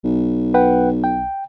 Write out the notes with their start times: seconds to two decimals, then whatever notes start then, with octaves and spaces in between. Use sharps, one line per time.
0.04 B1
0.54 B4 F#5 G5
1.04 G5